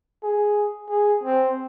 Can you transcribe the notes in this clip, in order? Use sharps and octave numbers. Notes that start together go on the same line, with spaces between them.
G#4
G#4
C4